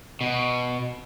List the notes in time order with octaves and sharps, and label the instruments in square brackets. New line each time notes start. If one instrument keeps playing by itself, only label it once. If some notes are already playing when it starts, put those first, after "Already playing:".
[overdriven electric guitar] B2